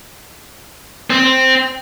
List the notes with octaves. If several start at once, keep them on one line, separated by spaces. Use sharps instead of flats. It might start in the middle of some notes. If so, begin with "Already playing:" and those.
C4